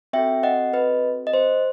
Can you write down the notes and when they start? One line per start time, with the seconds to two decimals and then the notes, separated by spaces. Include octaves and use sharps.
0.13 C4 F#4 A4 E5 G5
0.43 D#5 F#5
0.74 B4 D#5
1.27 D#5
1.33 C5